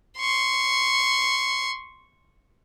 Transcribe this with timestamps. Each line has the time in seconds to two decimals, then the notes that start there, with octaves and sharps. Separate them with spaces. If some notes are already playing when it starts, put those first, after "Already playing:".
0.18 C6 C#6